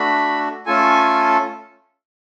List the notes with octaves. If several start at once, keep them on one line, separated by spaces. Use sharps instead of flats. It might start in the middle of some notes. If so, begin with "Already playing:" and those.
Already playing: A3 D4 F#4 B5
A3 C#4 F4 A4 G#5